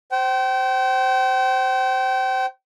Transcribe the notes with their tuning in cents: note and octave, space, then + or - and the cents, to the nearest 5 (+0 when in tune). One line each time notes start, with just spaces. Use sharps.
C5 +0 G5 -35